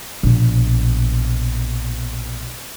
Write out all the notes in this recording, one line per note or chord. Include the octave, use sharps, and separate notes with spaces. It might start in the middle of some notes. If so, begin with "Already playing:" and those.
A#1 B2